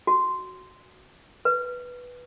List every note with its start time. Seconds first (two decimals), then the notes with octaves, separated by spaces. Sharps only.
0.07 F#4
1.45 B4